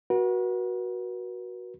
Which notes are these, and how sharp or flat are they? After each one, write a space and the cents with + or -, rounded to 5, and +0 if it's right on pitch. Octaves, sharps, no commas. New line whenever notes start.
F#4 +0 B4 -45